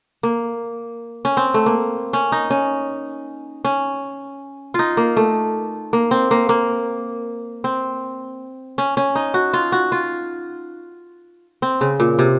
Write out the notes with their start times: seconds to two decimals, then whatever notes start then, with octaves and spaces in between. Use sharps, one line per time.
0.23 A#3
1.25 C#4
1.37 C4
1.54 A3
1.66 A#3
2.13 C#4
2.32 D#4
2.50 C#4
3.65 C#4
4.74 D#4 F4
4.97 A#3
5.17 A3
5.93 A#3
6.11 C4
6.31 A#3
6.49 A#3
7.64 C4
8.78 C#4
8.97 C#4
9.15 D#4
9.34 F#4
9.53 F4
9.72 F#4
9.92 F4
11.62 C4
11.81 C#3
12.00 A#2
12.19 C3